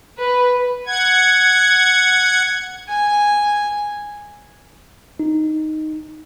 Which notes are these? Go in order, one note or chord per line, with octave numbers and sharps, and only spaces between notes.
B4
F#5 G#6
G#5
D#4